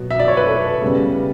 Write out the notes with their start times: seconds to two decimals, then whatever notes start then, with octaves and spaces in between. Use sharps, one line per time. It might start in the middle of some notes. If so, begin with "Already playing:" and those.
Already playing: B2 F#3
0.10 E5
0.20 D5
0.28 C#5
0.37 B4
0.46 A4
0.82 C#3 G3 B3